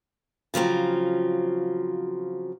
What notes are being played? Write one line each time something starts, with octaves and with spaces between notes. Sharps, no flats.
C#3 F3 F#3 C4